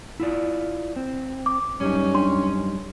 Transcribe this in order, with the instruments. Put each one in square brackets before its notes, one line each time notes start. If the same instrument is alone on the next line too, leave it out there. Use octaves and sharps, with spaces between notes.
[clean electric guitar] E4 F4 D5
C4
[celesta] D6
[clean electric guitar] F#2 G3 D#4 [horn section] C#4
[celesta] D4 C6